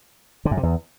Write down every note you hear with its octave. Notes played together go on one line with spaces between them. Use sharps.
D3
F#2
C3
E2